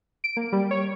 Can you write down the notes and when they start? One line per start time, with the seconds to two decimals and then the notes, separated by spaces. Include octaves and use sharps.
0.24 D7
0.37 A#3
0.53 G3
0.71 C#5